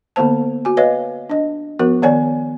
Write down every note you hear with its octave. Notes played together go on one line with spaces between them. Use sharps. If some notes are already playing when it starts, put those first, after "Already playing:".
D3 A#3 B3 C5 A5
F#4 G#5
B4 C#5 D#5 F5
D4 D#5
F3 B3 F#4 A#4
D#3 B3 C#5 D5 G#5